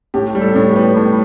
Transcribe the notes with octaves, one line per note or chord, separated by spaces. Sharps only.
A2 G4
G3
A4
A2
G4
B3
A2